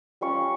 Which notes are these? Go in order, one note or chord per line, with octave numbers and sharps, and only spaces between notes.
G3 C#4 F4 C#6